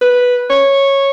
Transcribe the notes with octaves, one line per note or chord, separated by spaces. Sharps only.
B4
C#5